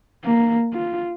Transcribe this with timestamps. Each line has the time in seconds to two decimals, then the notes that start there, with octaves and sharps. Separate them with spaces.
0.25 A#3
0.73 F4